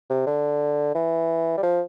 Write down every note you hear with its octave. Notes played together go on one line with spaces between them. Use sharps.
C3
D3
E3
G3
F3